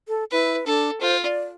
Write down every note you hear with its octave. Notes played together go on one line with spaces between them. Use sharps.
A4
E4 B4
D4 A4
F4 C5
D5